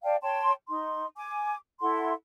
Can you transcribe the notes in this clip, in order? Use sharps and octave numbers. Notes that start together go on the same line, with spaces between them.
D5 F5 G5 A5
C#5 G5 A5 C6
D#4 C6
G#5 D6
E4 A4 F#5 C6